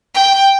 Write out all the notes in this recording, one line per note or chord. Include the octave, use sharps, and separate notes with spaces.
G5